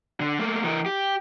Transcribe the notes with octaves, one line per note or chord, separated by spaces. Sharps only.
D3
A3 A#3
E3 A#4
G4